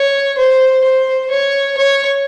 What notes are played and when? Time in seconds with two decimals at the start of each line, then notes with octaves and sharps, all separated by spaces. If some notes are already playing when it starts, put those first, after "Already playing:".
Already playing: C#5
0.38 C5
0.84 C5
1.31 C#5
1.78 C#5